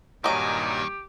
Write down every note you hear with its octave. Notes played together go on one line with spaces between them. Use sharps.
G2 A#2 D#3 F#3 G4 D#5 G#5 A#5